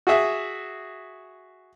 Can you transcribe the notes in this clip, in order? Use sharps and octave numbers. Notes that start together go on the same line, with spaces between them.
F#4 G#4 E5